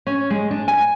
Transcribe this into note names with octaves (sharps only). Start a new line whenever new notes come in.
C#4
G#3
D4
G#5